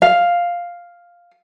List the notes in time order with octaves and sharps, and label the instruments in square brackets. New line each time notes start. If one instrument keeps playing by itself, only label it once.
[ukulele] F5